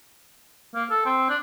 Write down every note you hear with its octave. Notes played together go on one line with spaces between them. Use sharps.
A#3
A4
C4
D4